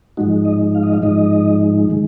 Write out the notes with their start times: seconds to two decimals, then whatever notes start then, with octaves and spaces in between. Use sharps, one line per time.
0.17 G#2 F3 G#3 D#4 F#4
0.45 D#5
0.75 F5
0.83 D#5
0.94 F5
1.02 G#2 F3 G#3 D#4 D#5
1.90 D#3 G#3